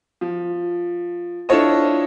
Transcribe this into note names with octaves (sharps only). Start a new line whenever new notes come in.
F3
D4 E4 F4 A4 C#5 D#5